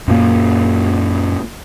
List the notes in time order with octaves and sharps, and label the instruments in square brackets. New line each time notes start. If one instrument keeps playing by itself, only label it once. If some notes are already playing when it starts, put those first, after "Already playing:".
[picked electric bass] F#2 A#2 A#3